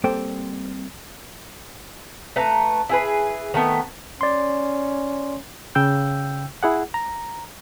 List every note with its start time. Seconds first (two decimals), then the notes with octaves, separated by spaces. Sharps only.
0.04 G3 A#3 C4 A4 C5 G5
2.36 A3 B4 A#5
2.89 E4 G#4 B4
3.54 D#3 A3 B3
4.21 C#4 D5 C6
5.75 C#3 G5 E6 G6
6.63 E4 G#4 F#5
6.94 A#5